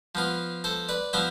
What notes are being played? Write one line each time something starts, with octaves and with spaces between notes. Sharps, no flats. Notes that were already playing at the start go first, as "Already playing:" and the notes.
F3 B3 F4
A4 C5
B4 D5
F3 B3 F4 C5 E5